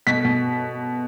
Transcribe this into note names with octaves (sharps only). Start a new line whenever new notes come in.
B2 B6
B2